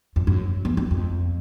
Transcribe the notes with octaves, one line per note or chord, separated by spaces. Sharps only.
F2
F#2
E2
F2
F2